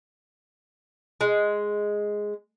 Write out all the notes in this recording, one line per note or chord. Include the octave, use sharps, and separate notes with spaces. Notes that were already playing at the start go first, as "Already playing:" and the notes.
G#3